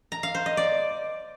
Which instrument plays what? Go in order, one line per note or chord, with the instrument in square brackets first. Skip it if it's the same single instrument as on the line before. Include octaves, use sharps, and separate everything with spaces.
[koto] A#5
F5
C5
D#5
D5